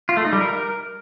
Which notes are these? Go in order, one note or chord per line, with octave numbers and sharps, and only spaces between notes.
F4
A3
D#4
G3
A#4